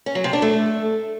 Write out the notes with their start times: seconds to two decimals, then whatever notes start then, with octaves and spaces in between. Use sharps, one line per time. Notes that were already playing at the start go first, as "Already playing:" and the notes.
0.06 C#4
0.15 F#3
0.24 C3
0.33 D4
0.42 A3